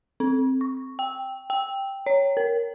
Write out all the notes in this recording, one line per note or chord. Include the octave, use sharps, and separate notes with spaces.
C4
C#6
G5
G5
C#5
A#4